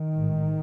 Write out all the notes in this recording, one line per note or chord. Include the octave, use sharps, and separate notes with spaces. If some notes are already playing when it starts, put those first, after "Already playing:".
Already playing: D#3
A1 G#2